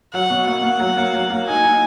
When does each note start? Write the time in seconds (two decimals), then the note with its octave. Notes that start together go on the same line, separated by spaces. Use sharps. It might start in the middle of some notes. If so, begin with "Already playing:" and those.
0.13 F#3 F#5
0.30 B2
0.47 A#3 F#5
0.63 A#3
0.80 F#3
0.97 A#3
1.14 F#3
1.30 A#3
1.47 D#4 G#5
1.64 D#4